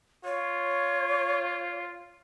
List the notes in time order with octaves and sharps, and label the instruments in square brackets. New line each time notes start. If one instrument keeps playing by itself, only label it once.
[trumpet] F4 [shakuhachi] C#5